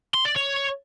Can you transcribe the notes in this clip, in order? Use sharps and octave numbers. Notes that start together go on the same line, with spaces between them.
C6
D5
C#5